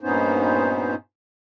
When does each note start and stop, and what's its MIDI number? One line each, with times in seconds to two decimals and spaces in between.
0.01 0.95 43
0.01 0.95 46
0.01 0.95 59
0.01 0.95 61
0.01 0.95 63
0.01 0.95 72